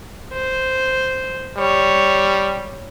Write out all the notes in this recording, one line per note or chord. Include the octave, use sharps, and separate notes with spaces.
C5
G3 C#5